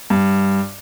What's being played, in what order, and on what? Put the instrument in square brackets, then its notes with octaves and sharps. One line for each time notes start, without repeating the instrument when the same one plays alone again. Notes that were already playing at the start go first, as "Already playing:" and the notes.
[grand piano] G2